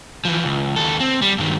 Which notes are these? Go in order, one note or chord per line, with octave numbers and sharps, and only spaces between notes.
E3 F3
C#2
D#2 A4
C4
G3
G2 D#3